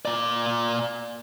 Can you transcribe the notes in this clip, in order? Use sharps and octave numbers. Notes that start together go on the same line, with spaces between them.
A#2 D5